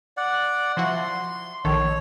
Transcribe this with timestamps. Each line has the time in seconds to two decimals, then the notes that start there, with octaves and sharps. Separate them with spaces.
0.17 D5 F#5
0.77 F3 E4 F#4 C6
1.65 A#1 D#3 A4 C#5